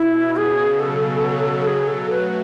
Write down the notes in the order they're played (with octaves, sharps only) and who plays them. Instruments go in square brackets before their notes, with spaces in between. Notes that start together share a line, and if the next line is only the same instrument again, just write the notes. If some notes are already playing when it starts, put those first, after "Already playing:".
Already playing: [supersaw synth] B2 [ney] E4
[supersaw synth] C#3 [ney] G#4
[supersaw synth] F#3 [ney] A4
[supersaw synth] F#3 [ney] G#4
[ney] A4
[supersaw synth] A3 [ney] B4